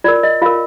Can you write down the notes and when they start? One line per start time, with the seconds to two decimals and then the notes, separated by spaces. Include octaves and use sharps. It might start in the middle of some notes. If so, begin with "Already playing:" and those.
0.04 F4 A#4 D5
0.23 D#5
0.42 F4 A#4 F5